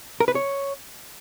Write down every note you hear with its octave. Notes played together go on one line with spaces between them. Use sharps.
A#4
B4
C#5